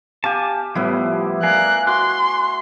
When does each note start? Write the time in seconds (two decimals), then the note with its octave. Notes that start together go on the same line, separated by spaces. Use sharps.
0.24 G4 F5 G#5 A5 D6
0.75 A2 F3 G3 B3 E4
1.43 A#4 D5 F5 G#5 F#6
1.87 F#4 C6 D6 F#6